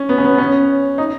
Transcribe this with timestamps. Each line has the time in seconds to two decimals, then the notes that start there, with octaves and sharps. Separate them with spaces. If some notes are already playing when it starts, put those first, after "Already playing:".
Already playing: C#4
0.09 B3
0.18 C#4
0.24 B3
0.35 B3
0.38 C#4
0.98 D#4